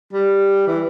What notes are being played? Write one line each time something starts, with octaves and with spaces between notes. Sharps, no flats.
G3
E3